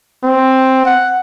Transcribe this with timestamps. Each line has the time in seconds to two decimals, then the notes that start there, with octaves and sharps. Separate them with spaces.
0.24 C4
0.86 F#5